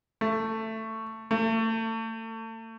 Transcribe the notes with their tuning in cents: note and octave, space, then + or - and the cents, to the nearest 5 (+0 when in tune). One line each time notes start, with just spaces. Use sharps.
A3 +15
A3 +35